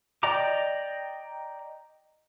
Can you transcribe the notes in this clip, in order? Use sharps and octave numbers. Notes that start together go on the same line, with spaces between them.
D5 D#5 G5 A#5 D6